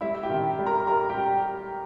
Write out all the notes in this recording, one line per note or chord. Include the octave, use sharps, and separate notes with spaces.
G3 E4 E5
E5
G4 G5
D#3
G3
A#4 A#5
G3 A#4 A#5
G4 G5